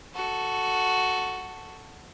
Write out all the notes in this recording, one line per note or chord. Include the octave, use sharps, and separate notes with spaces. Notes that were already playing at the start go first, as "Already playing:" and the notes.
F#4 A4